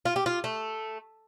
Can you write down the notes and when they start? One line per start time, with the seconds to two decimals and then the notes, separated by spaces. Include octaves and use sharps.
0.05 F4
0.16 G4
0.26 F4
0.44 A3